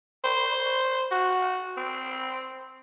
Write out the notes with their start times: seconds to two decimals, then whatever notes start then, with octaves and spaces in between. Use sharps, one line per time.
0.24 C5
1.11 F#4
1.77 C4